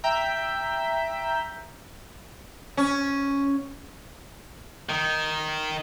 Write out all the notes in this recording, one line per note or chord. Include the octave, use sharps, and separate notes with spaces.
E5 G5 A#5 E6 G6 B6
C#4
D#3